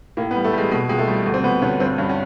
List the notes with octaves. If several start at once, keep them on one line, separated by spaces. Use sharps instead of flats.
A2 A#3
B3
G3
A3
G3 G#3
B2 G#3
C#2 G#3
A3
G3
D2
C4
D2 B3
D2 C#4
G2 C4
G2 C#4
C#4